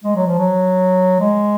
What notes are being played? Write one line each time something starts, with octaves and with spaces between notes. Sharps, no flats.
G#3
F#3
F3
F#3
G#3